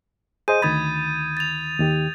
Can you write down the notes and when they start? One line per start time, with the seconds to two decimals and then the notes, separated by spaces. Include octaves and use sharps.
0.48 G#4 C5 D#5 G6 D#7
0.62 D2 D#3 B5 D#6 G#6 A6
1.37 A6 F7
1.79 D#2 D#3 G4